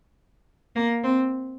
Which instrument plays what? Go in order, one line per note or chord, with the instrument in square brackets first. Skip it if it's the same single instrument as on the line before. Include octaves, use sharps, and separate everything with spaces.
[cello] A#3
C4